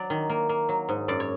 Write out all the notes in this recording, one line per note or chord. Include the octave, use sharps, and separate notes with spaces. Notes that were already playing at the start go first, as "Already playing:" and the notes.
Already playing: F#3 D5
D#3
A#3
A#3
F#3
G#2
F#2 D5
C#5